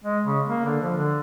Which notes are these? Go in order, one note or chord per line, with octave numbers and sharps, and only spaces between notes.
G#3
C#3
A#3
D3
F3
D3